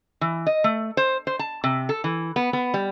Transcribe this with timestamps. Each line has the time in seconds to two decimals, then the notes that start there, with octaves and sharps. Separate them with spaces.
0.21 E3
0.47 D#5
0.64 A3
0.97 C5
1.27 C5
1.39 A5
1.64 C3
1.89 A4
2.04 E3
2.36 B3
2.53 B3
2.74 G3